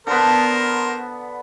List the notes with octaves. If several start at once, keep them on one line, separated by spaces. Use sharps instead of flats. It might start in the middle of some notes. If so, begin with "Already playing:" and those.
D3 B3 A#4 C5